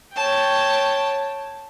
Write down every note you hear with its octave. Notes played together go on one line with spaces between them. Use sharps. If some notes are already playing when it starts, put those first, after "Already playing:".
C#5 G5 A5